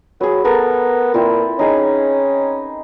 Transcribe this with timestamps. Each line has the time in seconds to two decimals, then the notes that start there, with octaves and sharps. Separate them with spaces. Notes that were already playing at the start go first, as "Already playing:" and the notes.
0.21 F#3 G#4 B4
0.45 B3 A4 A#4 C#6
1.14 A#2 C4 E4 B4
1.59 C#4 D#4 G#4